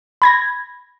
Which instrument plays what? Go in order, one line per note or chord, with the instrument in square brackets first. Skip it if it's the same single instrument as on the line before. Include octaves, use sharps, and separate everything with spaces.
[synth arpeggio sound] B5 G#6 A#6